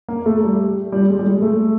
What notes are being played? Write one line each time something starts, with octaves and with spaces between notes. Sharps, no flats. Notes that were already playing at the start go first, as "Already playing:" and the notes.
A#3
A3
G3
G3
G#3
G3
G#3
A3